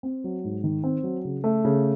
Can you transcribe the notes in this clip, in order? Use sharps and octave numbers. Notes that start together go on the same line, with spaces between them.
C4
F#3
G#2
D#3
C4
F#3
C#3
A3
C#3